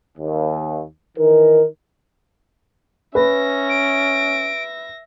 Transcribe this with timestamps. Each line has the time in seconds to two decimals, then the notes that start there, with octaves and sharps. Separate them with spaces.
0.18 D#2
1.18 D#3 E3 D#4 A#4
3.15 C#4 B4 E5 A#6
3.70 D7